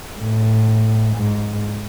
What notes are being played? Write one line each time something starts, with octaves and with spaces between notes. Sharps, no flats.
A2
G#2